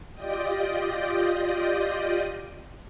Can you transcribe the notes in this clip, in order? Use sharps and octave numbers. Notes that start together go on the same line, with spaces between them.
F4 G4 D5 D#5 G5 D#6